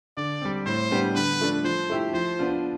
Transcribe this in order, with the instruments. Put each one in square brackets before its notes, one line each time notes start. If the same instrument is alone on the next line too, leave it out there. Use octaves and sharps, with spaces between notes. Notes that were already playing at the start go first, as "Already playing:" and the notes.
[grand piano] D3 [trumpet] D5
[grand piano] G3 C4
[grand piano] A2 [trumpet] C5
[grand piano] G3 B3 D4 G4
[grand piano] D3 [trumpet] B4
[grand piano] F3 A3 D4
[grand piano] F3 [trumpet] C5
[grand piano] A3 E4 G4
[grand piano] F3 [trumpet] C5
[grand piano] B3 D4 F4